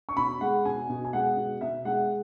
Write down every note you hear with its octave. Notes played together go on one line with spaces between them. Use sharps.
C#6
B2 B5
G#3 F#5
B2 G#5
B2
G#5
G#3 F#5
B2
B2 E5
G#3 F#5